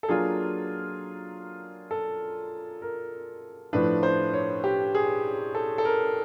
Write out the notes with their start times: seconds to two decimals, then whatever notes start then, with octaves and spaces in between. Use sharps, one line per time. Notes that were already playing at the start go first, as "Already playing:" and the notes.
0.03 A4
0.09 F#3 A#3 D4 F4 G#4
1.91 A4
2.82 A#4
3.73 A2 F3 A3 D4 B4
4.03 C5
4.34 C#5
4.64 G4
4.95 G#4
5.55 A4
5.78 A4
5.85 A#4